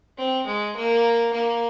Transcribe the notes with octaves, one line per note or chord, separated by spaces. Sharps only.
C4
G#3
A#3
A#3